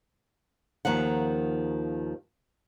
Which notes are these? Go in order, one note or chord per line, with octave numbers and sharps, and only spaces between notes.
D#2 D#3 F3 F#5